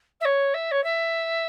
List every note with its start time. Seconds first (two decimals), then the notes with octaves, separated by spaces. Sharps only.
0.20 E5
0.25 C#5
0.54 E5
0.71 C#5
0.84 E5